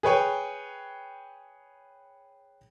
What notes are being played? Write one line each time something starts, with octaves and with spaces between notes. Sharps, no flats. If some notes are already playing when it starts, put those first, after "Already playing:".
G#4 B4 C#5 G5